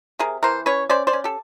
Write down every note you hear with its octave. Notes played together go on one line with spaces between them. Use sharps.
C3 G#4 A#4
E3 A#4 C5
C#4 B4 C#5
C#4 C5 D5
C5 D5
C#4
G4 A4